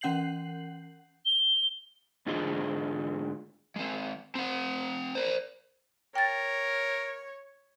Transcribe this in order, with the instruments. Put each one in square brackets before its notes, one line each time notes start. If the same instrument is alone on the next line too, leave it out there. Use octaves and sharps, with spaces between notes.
[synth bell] E3 C#4 F#5 G6 C7 F#7
[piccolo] G7
[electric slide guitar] G#2 D3 F4 G#4 D#5
[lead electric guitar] G#3 C4
C4 F#5
A#4 C5
[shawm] A#4 [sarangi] C#5 [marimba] G5 A6